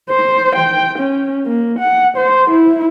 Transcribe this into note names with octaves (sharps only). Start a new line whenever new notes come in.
C5
G5
C#4
A#3
F#5
C5
E4